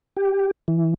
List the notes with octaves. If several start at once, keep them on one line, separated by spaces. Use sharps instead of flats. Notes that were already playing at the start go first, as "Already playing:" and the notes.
G4
E3